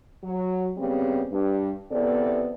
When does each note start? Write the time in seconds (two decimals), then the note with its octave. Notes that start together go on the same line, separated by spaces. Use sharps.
0.24 F#3
0.77 C#3 G3 B3 C4
1.32 G2
1.91 E2 C3 B3 A4 D5